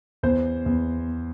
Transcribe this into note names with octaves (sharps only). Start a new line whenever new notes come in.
E2 C5
E2